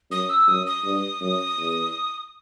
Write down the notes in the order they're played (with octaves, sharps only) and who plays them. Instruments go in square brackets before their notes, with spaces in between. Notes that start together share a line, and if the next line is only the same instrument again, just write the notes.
[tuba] F#2 [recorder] D#6
[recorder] E6
[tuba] F#2 [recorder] D#6
[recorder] D#6
[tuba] G2
F#2
E2